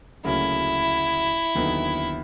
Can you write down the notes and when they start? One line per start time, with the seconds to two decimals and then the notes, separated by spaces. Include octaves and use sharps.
0.24 D2 C#3 F#3 A#3 C#4 E4
1.55 D#2 D3 F#3 B3 D#4